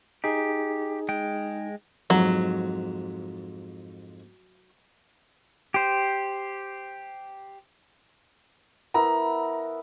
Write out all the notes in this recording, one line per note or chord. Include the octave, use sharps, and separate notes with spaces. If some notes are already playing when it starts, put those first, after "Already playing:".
D#4 G4 G#4
G#3 G5
F2 G#2 F#3
G4 C5
B3 E4 A#4 A#5